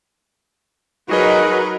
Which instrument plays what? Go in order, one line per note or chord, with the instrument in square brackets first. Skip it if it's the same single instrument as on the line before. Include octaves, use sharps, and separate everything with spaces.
[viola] F#3 B4 [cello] D#4 A#4 [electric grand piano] F#4 G#4 D#5